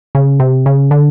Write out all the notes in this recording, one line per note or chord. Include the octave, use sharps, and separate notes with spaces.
C#3
C3
C#3
D3